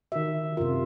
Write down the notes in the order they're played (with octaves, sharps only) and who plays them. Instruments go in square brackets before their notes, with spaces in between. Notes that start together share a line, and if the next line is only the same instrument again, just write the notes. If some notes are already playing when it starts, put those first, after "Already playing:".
[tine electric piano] D#3 F#4 [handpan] E5
[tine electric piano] F#2 A#4 [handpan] C3 F4